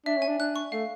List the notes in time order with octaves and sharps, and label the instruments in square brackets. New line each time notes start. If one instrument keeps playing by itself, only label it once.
[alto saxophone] D4 [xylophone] E5
[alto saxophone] C#4
[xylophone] G#5
[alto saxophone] D4
[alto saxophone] D4 [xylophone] F#6
[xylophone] C#6
[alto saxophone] A3 [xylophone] F5